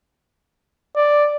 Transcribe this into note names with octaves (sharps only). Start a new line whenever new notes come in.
D5